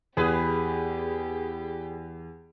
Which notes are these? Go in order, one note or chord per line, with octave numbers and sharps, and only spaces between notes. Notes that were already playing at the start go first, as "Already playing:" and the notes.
E2 G4 G#4 B4